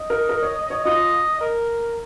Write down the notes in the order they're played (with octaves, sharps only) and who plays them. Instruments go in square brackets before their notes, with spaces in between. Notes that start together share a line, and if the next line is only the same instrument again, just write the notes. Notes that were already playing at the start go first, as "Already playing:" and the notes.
Already playing: [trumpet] D#5
[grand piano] A#4
A#4
C#5
C#5
[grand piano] F4 [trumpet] D#5
[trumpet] A#4